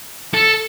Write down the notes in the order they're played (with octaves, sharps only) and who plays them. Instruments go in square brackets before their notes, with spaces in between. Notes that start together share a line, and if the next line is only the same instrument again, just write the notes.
[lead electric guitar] A4